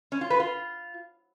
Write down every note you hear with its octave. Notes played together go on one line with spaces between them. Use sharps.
C#4
F4
B4
F4